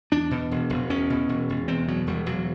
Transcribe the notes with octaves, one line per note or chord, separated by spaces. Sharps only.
E2 D4
B2
E1
E1
E2 C#4
B2
E1
E1
E2 C4
B2 F#3
E1 G3
E1 F#3